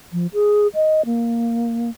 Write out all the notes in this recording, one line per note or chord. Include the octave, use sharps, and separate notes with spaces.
F3
G#4
D#5
A#3